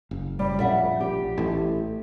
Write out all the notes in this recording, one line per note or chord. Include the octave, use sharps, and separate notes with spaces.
F#1
G3
A#1 D5 E5 F#5
G4
A1 A2